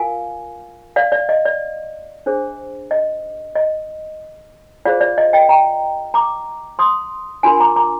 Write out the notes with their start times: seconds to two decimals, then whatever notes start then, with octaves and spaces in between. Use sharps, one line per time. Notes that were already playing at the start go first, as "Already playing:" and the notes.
Already playing: F4 A#4 F5 G#5
0.96 D5 F5
1.12 D5
1.29 D#5
1.45 D5
2.26 D4 G#4 C5
2.91 D#5
3.55 D#5
4.85 F4 G#4 C5 D5 F5
5.01 D5
5.18 D#5
5.33 D#5 G5
5.49 G5 A#5
6.14 A#5 D6
6.79 C6 D#6
7.43 D4 F4 A#4 G#5 C6
7.60 A#5 D6
7.76 A#5 D6